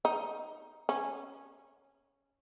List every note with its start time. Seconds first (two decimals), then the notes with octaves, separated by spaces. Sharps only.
0.05 D#4
0.89 C#4